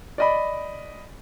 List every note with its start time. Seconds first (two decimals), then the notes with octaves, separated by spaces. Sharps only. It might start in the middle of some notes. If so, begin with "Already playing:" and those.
0.18 D5 D#5 B5